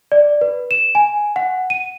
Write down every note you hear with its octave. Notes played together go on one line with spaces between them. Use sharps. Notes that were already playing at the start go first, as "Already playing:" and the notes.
D5
B4
E7
G#5
F#5
D#7